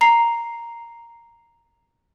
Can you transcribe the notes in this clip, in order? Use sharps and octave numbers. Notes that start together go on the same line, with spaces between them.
A#5 C7